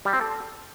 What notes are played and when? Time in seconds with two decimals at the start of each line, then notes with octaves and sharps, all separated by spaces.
0.05 G3
0.13 C4
0.21 A4